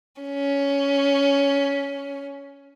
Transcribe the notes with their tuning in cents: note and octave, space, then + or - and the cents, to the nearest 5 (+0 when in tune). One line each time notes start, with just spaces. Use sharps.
C#4 +10